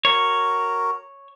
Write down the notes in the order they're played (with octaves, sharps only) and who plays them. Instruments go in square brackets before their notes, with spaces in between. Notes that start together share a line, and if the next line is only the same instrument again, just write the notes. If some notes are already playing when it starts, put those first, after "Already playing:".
[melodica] F#4 A#4 [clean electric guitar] C#5